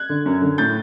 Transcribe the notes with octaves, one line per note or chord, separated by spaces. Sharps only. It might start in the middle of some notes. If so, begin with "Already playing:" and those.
Already playing: F#6 G#6
D3
F#2
D3
A2 G6 A6